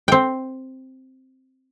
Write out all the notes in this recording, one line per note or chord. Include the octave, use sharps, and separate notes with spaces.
C4 G5